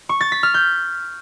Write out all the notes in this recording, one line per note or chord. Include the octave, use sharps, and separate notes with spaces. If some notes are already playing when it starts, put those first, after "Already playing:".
C#6
A6
B6
F6
G6